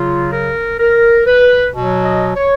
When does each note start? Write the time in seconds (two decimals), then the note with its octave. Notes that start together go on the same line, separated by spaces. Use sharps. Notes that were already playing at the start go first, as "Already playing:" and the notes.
Already playing: C#3 F#3 F4
0.32 A#4
0.79 A#4
1.26 B4
1.74 B2 F#3
2.05 D#5
2.36 C#5